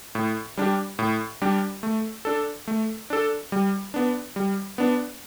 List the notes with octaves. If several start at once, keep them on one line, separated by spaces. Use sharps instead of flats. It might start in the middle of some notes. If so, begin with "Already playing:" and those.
A2
G3 D4 G4
A2
G3 D4 G4
A3
D4 A4
A3
D4 A4
G3
B3 D4
G3
B3 D4